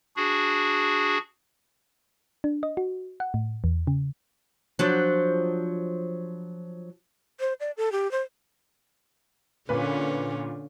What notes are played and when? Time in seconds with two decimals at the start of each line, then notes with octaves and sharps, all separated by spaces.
0.16 D4 F#4 G#4
2.44 D4
2.63 D#5
2.77 F#4
3.20 F#5
3.34 A2
3.64 E2
3.87 C#3
4.79 F3 F#3 D4
7.40 C5
7.60 D5
7.77 A4
7.92 G4
8.11 C5
9.69 A#2 D3 C#4 B4